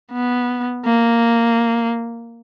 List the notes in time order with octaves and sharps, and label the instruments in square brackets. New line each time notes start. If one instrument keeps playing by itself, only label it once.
[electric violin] B3
A#3